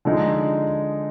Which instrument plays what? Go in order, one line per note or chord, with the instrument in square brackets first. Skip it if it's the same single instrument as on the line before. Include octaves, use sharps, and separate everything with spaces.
[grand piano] D3 F3 G#3 D#4